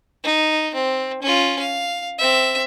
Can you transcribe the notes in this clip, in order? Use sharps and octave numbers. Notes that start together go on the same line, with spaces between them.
D#4
C4
C#4 F4
F5
C4 E5